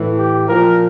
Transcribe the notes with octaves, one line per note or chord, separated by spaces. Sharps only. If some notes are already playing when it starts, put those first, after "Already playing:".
Already playing: A2 E3
G4
A#2 F3 A#4